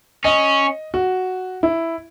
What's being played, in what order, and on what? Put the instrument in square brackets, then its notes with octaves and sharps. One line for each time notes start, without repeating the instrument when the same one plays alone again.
[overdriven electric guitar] C#4 [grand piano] D#5
[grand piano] F#4
E4